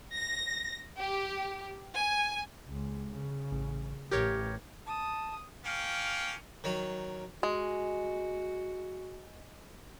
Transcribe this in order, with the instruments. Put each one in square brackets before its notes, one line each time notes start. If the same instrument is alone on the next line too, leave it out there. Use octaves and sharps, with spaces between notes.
[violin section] A#6
G4
G#5
[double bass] C#2
C#3
[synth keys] A1
[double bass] A1 [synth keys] G4 A#4 C#5
[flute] A5 [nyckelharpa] D#6
[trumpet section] A#3 C#4 F5 G5
[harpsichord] D#3 F#3
[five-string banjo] G#3 [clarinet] F#4